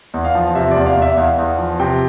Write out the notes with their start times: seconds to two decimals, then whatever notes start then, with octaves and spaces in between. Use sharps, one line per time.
0.14 E2
0.25 F5
0.35 F3
0.55 C3 E5
0.71 E2 D5
0.86 F5
0.97 E2 E5
1.17 E2 F5
1.39 E2
1.58 F3
1.80 C3 G5